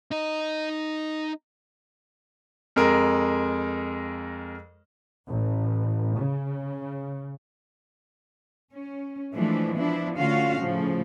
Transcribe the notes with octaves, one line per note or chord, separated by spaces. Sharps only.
D#4 D#5
F2 G#3 A#4
A1
C#3
C#4
E3 F3 G#3 A3 D4 E4
F3 B3 D4 E4
D3 A3 C#4 F4 F#4 F5
A2 C#3 F3 A3